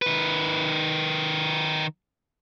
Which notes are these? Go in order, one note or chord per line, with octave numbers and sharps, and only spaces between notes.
D#3 B4